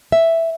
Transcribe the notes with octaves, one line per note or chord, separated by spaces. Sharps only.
E5